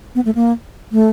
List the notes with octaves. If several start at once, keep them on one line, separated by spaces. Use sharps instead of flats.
B3
A3
A#3
A3